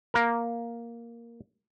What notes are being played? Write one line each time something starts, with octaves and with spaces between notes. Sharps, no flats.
A#3 A#4